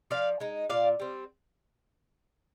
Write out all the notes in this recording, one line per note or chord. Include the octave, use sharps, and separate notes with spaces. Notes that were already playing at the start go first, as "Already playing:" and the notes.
F3 D5 F5
G#3 D#4
A#2 D5 F5
G3 C4